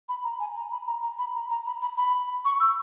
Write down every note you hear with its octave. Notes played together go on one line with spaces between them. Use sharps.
B5
A#5
G#5
A#5
B5
A#5
A#5
B5
A#5
A#5
B5
B5
B5
C#6
E6